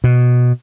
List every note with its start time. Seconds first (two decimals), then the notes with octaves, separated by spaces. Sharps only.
0.04 B2